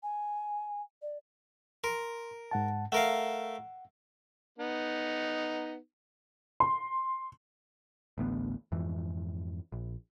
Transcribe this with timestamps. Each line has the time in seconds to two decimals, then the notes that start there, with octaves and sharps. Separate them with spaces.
0.02 G#5
1.01 D5
1.84 A#4 C6
2.51 G#2 F#5 A5
2.92 A3 A#4 F5 F#5
4.58 B3 D#4
6.60 C6
8.18 A1 D2 B3
8.72 F2 G#2 E3
9.72 A#1